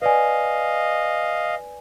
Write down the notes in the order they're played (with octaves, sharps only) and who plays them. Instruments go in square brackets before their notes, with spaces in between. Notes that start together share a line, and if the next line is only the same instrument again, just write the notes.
[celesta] B4 D5 G#5 [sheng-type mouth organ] D#5 F5